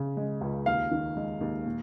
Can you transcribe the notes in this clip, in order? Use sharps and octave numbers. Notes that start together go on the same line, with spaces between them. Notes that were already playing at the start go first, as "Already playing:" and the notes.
Already playing: C#3 C#4
G#3
C#2
D#2 F5
D#3
G#3
D#2
A#2